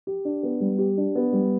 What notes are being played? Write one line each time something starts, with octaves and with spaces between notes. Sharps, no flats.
G4
D4
B3
G3
G4
D4
B3
G3